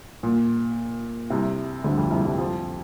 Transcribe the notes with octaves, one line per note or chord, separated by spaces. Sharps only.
A#2
C2 C3
D2 D3
F2 F3
C2 C3
C2 C3
F2 F3